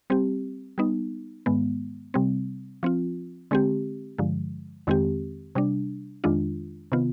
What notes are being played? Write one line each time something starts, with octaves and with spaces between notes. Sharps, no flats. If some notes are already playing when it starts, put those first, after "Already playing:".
G3 C4 G4
G3 B3 D#4
G#2 D#3 G#3 B3
C3 G3 C4
F3 C4 F4
D3 G#3 C4 G4
G2 D3 F3 G#3
F2 D#3 G#3 C4 G4
C3 G3 D4
F2 D#3 G#3 D4 F4
C3 D#3 B3 F4